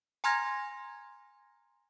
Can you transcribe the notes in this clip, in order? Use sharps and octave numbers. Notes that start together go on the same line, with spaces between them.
G#5 A#5 C6 F6 G#6 A#6